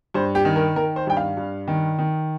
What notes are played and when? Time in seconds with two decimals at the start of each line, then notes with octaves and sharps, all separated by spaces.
0.14 G2 C5
0.35 G4
0.45 D#3
0.56 A#4
0.76 D#3 A#4
0.96 C5
1.07 G2 G5
1.17 F5
1.37 G2
1.68 D#3
1.99 D#3